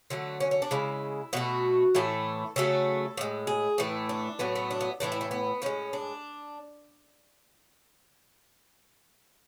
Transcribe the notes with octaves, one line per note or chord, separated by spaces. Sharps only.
D3 F#3 A3
C#4
C#4
D4
C#3 G#3 E4
B2 A3 F#4
A2 E3 A3 A4
C#3 F#3 A3 A4
A2 G#3
G#4
A2 E3 A3
D4
A2 F#3 A3 B3
B3
D4
B3
A2 E3 A3 D4
E4
A3
B3
A2 G#3 C#4
D4